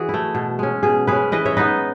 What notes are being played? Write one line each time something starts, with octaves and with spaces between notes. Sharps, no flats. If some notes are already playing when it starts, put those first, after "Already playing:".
Already playing: E3 F#4 G#4
A3 E4
B2
G#3 C#4
B2 G#4
G#3 C#4 G#4 B4
E3 B4 D#5
C#5 E5
B3 D#4 B4 D#5